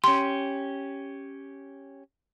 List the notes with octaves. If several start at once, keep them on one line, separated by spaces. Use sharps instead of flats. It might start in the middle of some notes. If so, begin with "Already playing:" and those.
C#4 G4 C6